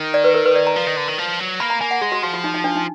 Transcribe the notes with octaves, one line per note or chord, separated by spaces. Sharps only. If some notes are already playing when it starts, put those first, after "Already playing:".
Already playing: D#3
D5
B4
A#4
B4
D5
A#5
F3
D#3
D3
D#3
F3
F#3
A#3 B5
A#5
A#3 G#5
F#5
G#3 G#4
F#4
F3 F#4
F4
D#4
D#4
D4
D#4